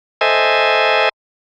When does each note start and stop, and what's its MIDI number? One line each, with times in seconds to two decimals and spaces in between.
0.21 1.09 69
0.21 1.09 72
0.21 1.09 75
0.21 1.09 76
0.21 1.09 80